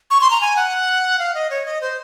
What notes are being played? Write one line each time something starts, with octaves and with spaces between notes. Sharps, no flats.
C#6
C6
A#5
G#5
F#5
F5
D#5
C#5
D#5
C5